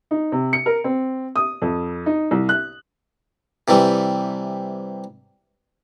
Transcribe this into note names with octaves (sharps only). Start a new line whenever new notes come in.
D#4
C3
C#7
A#4
C4
D#6
F2
D#4
C2
F#6
C3 E3 G3